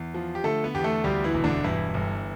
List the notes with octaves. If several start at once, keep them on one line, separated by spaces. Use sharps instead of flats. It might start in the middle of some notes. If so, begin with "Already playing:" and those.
Already playing: E2
F3
G4
D3 A3 A4
B3 B4
E2 G4
A3 A4
D2 G3 G4
E3 E4
E1
D3 D4
G2 E3 E4
G1